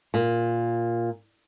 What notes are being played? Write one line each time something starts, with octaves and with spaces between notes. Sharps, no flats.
A#2